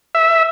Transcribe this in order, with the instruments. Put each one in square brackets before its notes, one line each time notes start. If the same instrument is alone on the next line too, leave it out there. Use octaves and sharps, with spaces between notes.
[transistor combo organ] E5